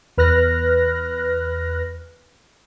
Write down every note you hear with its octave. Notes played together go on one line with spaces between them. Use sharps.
E2 B4 F6 F#6 A#6